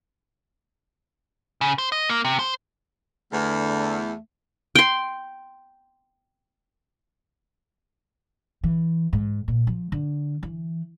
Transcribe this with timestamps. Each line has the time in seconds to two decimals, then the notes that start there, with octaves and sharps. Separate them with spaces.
1.61 C#3
1.78 C5
1.92 D#5
2.09 A#3
2.25 C3
2.39 C5
3.33 E2 D3 A3
4.76 G5 C6
8.64 E3
9.13 G#2
9.48 A#2
9.67 F3
9.92 D3
10.43 E3